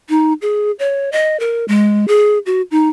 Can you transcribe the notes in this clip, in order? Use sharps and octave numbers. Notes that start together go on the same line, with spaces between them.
D#4
G#4
C#5
D#5
A#4
G#3
G#4
F#4
D#4